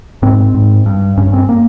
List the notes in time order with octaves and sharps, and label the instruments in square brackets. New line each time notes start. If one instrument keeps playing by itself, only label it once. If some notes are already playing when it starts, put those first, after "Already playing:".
[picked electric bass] G#2 C4
G#2
G2
G2 C#4
C4
A#3